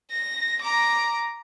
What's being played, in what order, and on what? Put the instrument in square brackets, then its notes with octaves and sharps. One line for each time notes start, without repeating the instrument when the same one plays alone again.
[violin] A#6
A#5 D6